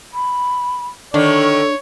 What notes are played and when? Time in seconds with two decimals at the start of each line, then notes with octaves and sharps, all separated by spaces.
0.14 B5
1.14 D3 D#3 D4 A4 C#5